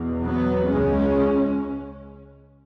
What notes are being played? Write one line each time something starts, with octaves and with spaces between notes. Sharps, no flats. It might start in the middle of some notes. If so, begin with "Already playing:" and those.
Already playing: E2 B2
F#3 B3
C#2 C#3 G#3 C#4